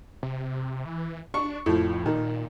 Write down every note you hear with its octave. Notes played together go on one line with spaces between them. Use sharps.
C3
E3
D4 C#6
F2 A2 F3
A#2 D#3